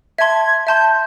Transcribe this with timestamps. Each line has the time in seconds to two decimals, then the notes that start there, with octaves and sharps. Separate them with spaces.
0.18 E5 A5 C6 G#6
0.67 E5 A5 C6 G6